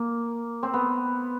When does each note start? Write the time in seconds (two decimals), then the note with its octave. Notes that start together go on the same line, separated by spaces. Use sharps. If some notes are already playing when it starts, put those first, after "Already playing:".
Already playing: A#3
0.63 C4
0.74 B3